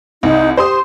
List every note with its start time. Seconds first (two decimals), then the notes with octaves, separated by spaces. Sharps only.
0.23 C2 D#4
0.57 G4 C5 C6 D#6